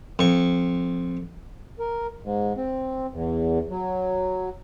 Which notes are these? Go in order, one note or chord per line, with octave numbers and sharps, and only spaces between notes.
F2 C#6
A#4
G#2
C4
E2
F#3